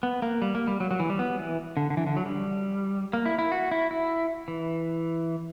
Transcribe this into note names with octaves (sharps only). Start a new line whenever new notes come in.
B3
A#3
G3
A#3
G3
F#3
F#3
E3
G3
B3
E3
D3
D3
E3
D3
F#3
G3
A#3
E4
E4
F#4
E4
E4
E3